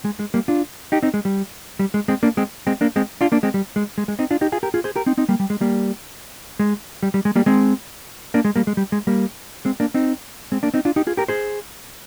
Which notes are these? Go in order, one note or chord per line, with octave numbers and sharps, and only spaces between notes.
G#3
G#3
G3 A#3
D4 F4
D#4 G4
C4 D#4
G#3
G3
G3
G#3
G#3 C4
A#3 D4
G#3 C4
G#3 C4
A#3 D4
G#3 C4
D4 F4
A#3 D4
G#3 C4
G3
G#3
G#3
G#3
C4 D#4
D4 F4
D#4 G4
F4 G#4
G4 A#4
F4 G#4
G#4 C5
G4 A#4
C4 D#4
C4 D#4
G3 A#3
G3
G#3
G3 A#3
G#3
G3
G3
G#3
G3 A#3
G#3 C4
A#3 D4
G#3
G3 A#3
G#3
G3
G#3
G3 A#3
G#3 C4
A#3 D4
C4 D#4
G#3 C4
A#3 D4
C4 D#4
D4 F4
D#4 G4
F4 G#4
G4 A#4
G#4 C5